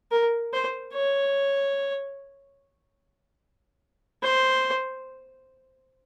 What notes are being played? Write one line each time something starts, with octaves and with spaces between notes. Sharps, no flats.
A#4
C5
C#5
C5